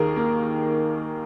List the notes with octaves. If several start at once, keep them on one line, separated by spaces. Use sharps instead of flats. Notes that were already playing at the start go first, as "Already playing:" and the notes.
Already playing: D#2 D#3 G#4 A#4
A#3